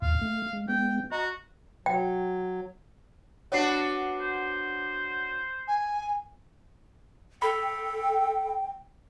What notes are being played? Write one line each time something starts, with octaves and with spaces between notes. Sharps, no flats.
D#2 A2 F5
A3
G#3
G#3 B3 G5
F#4 D#5 A#5
F#3 G5
B3 D4 F#4 C#5 F#5 C7
C5
G#5
A4 G5 B5